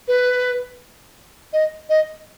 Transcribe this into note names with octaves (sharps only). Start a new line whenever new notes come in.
B4
D#5
D#5